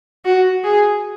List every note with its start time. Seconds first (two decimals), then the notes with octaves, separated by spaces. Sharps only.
0.25 F#4
0.64 G#4